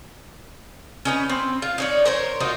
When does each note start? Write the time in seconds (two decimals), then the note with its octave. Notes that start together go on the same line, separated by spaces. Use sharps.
1.05 C#4 D#4 B4
1.29 C4
1.62 F4
1.78 D#4 C#5 D5
2.05 A#4 C5 C#5
2.40 D#4 F4 F#4 C5